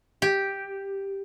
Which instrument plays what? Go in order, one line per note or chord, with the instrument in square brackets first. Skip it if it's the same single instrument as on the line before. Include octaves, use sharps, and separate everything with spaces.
[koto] G4